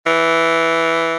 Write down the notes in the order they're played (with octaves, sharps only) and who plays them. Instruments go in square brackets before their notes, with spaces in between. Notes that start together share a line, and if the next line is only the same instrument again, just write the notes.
[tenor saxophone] E3